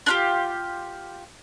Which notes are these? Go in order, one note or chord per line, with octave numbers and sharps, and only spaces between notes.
D4 F4 G4